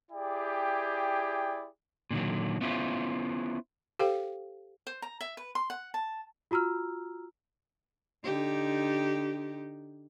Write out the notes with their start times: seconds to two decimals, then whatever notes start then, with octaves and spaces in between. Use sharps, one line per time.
0.12 E4 G4 G#4 D5 G5
2.11 A#2 D3 D#3 F#3
2.61 B3 C#4 E4 F4 C5
3.99 G4 A4 C5 F5 G5
4.87 C5
5.02 A#5
5.21 E5
5.37 B4
5.55 C6
5.70 F#5
5.94 A5
6.51 F4 F#4 A#5 E6 F6
8.24 D3 D#4 G4